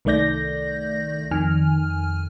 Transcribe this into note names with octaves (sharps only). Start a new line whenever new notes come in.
C2 D#3 A3 D5 G6 A#6
F2 D#3 G#5 F6